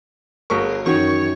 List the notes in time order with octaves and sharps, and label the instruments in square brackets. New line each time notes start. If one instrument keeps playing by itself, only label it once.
[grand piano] G1 C#6 [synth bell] F#4 G#4 A#4
[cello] F#2 C#5 [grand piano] D#3 [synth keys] E3 C#4 F#4 [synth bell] C#6